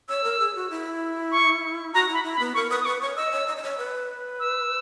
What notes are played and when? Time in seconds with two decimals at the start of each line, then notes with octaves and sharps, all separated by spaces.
0.09 C#5 E6
0.24 A#4
0.40 G#4
0.55 F#4
0.70 E4
1.32 C#6
1.94 F#4 A#5
2.09 E4 B5
2.24 E4
2.35 B5
2.40 B3
2.54 A#4 C#6
2.70 B4 D#6
2.81 D#6
2.86 B4 C#6
3.01 C#5 C#6
3.16 D#5 E6
3.32 C#5
3.47 D#5
3.57 D#5
3.63 C#5
3.78 B4
4.40 E6